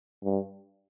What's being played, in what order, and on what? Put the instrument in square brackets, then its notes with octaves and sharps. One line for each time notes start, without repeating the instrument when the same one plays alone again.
[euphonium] G2